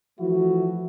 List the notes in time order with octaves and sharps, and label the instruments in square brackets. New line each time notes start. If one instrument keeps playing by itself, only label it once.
[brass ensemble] E3 F3 A3 E4 F#4